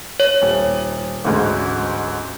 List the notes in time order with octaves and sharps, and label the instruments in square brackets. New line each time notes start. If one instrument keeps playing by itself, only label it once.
[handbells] C#5
[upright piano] D#1
A1 D2 G#2